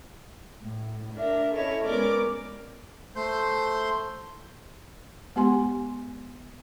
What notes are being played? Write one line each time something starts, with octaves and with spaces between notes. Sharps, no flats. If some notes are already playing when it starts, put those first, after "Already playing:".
A2
D4 A#4 E5
C#4 E4 A4 C#5 D#5 E5
G#3 B3 C#4 A#4 D5 D6
A3 C5 C6 G6
G#3 B3 G4 G#5 C6